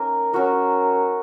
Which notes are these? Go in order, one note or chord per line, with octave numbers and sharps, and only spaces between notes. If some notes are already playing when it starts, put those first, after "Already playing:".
Already playing: A#3 C#4 D#4 A#4
F#3 C#4 F#4 A#4